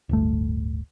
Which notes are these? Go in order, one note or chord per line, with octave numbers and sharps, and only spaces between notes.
D1 G1 A3